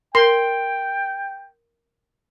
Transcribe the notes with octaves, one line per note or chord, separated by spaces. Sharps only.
A#4 G5 C6